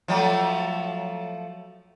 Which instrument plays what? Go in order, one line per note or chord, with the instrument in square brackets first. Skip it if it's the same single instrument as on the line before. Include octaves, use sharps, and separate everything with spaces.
[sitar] F3 F#3 A3